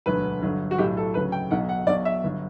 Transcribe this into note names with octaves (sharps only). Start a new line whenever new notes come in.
E1 D2 D3 F#3 B4
G1 G2 D3 F#3
F#4
B1 A2 F#3 G4
A4
D2 C#3 F#3 B4
G5
B1 B2 F#3 F#5
F#5
B1 B2 F#3 D5
E5
G1 F#3